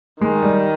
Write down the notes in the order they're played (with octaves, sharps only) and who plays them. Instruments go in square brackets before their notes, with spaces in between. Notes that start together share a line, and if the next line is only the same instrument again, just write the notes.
[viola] D#3 [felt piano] G#3
[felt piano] G3